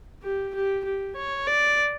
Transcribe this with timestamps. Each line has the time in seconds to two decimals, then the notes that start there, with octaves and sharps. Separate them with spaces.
0.23 G4
0.55 G4
0.85 G4
1.16 C#5
1.47 D5